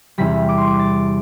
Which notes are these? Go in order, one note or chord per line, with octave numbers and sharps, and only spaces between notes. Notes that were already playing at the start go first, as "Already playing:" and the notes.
E2 C3 G3 B6
D6
C6
D6
A6